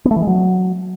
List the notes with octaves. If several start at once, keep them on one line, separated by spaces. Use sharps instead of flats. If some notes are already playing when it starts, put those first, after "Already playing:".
B3
A3
E3
G#3
F#3